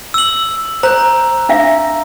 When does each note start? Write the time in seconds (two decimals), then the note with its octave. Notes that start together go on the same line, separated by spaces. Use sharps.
0.14 E6 F#7
0.83 C5 A#5 G6
1.49 D4 E5 F5